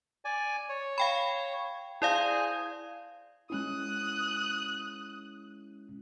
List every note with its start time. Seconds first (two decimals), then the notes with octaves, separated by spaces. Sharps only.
0.25 D5 G#5
0.69 C#5
0.98 F5 G5 B5
2.02 E4 G#4 C5 D5 F5 G#5
3.50 G#3 C#4 E4 D#6 F#6